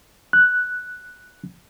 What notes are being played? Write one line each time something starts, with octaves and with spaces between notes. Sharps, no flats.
F#6